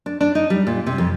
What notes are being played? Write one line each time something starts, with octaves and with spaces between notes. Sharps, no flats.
D4
D4
D#4
G3
A#2
C3
F2